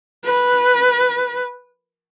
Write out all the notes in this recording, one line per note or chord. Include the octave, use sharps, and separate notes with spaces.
B4